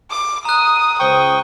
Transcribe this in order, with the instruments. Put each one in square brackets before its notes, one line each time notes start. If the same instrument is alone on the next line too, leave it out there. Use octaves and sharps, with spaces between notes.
[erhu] D6
[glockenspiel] A#5 F#6 [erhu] D#6
[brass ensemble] C#2 C5 [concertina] G5 C#6 [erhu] D#6